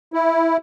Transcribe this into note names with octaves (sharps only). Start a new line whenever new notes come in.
E4